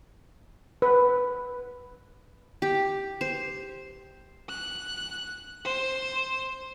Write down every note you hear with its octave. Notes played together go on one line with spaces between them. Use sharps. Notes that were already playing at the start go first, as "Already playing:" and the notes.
B4
G4
C5
F#6
C5